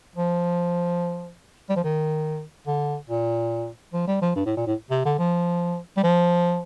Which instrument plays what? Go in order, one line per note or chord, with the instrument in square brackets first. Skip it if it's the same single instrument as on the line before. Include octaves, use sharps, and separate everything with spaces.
[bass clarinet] F3
G3
F3
D#3
D3
A#2
F3
G3
F3
G2
A2
A#2
A2
C3
D3
F3
G3
F3